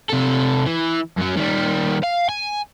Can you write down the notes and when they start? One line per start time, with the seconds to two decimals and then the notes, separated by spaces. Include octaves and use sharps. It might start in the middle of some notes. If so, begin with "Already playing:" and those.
0.10 C3 A4
0.67 E3
1.17 F#2 F#3
1.37 D#3 G3
2.03 F5
2.29 G#5